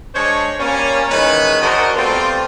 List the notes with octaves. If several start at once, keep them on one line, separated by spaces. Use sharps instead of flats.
G#3 D4 C5 C#5
G3 A#3 C#4
D#3 E3 G#3 C#4 B4
D4 F#4 A#4 C5 D#5
G3 A3 B3 C4 F4